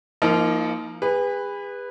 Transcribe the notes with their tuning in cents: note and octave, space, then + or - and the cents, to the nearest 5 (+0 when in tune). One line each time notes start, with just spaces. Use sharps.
F3 -25 A#3 +0 D#4 +20
G#4 -40 B4 +0